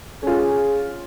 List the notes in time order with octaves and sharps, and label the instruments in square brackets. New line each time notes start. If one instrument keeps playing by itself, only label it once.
[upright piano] C#4 F4 [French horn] G#4